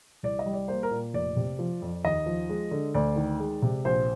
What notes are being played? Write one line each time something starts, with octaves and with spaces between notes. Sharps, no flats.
C2 D5
D#5
G3
D5
A#3 C5
A#4
A#2
F1 D5
C3
F3
F2
D#2 D#5
F3
G#3
D3
D2 D5
D#3
G#3
C3
A#1 C5